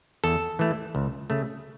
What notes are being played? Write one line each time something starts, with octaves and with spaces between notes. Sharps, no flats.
E2 A4
E3 A3
C#2
C#3 A3